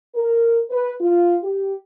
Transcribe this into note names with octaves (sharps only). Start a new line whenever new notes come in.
A#4
B4
F4
G4